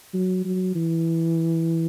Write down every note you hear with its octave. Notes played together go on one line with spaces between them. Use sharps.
F#3
F#3
E3